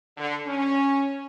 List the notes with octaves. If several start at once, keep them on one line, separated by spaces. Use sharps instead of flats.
D3
C#4